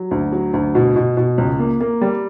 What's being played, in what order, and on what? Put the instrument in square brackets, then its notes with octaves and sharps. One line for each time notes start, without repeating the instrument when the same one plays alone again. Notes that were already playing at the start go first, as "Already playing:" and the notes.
Already playing: [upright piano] F#3
D2
F#3
D2
B2
B2
B2
C#2
A#3
A#3
G3